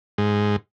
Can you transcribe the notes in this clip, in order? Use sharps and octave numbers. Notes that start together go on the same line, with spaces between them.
G#2